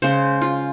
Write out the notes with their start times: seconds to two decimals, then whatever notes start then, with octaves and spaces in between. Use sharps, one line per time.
0.02 C#3 G#3 C#4 C5
0.42 F4